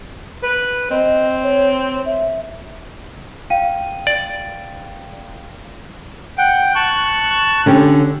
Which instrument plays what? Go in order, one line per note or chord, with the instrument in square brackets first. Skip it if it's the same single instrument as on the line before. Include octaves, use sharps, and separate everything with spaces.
[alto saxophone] B4
[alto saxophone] C4 [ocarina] D#5
[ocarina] C#5
E5
[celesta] F5 G5 D#7
[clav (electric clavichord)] D5
[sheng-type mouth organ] F#5 G5
A5 C#6 F#6
[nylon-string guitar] D3 C#4 G4